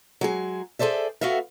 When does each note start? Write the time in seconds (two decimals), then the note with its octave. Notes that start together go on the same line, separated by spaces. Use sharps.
0.21 F#3 G#3 G#4
0.79 G#4 A4 C5 D5 E5
1.21 B3 F#4 A4 E5 F5